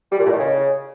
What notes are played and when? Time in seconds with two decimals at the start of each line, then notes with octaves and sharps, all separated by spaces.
0.12 G3
0.19 A#2
0.26 A2
0.33 D#3
0.40 C#3